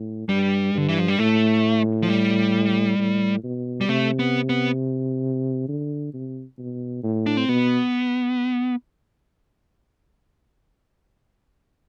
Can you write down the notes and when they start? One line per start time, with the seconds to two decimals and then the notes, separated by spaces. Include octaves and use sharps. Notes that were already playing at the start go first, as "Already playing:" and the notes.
Already playing: A2
0.29 G2 G3
0.74 G2 D3
0.88 E3
0.99 F3
1.08 G3
1.19 A2 A3
2.02 F3
2.09 G3
2.99 A2
3.44 B2
3.81 G3
3.89 C3 A3
4.19 B3
4.49 B3
5.69 D3
6.14 C3
6.58 B2
7.03 A2
7.26 D4
7.37 C4
7.49 B2 B3